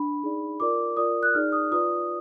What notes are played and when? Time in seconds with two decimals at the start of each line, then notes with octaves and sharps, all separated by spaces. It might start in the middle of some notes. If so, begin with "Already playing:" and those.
Already playing: D4 B5
0.23 D#4 G#4 D5
0.60 F4 A#4 D5 D6
0.97 F4 A#4 D5 D#6
1.23 F#6
1.34 D#4 G#4 D5 F6
1.52 D#6
1.72 F4 B4 D5 D#6